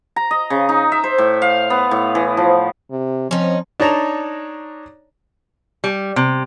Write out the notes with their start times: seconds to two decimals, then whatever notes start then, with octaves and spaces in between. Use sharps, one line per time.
0.16 A#5
0.31 D#5
0.50 C#3
0.69 D#4
0.92 E5
1.04 C5
1.18 A2
1.42 F5
1.70 B3
1.91 A2
2.15 E3
2.37 F3
2.91 C3
3.31 F3 C4 C#4 D#4
3.80 D4 D#4 C#5 A5 A#5
5.84 G3
6.16 C3